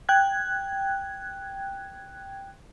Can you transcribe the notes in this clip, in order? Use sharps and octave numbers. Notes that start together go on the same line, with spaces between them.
G5 F#6 G#6